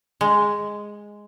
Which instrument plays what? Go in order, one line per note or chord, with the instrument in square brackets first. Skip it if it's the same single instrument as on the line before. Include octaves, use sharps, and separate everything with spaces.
[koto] G#3